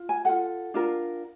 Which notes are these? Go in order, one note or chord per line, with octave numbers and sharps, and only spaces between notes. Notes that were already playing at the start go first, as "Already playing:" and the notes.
Already playing: F4
G#5
F4 A4 F#5
D4 F4 A#4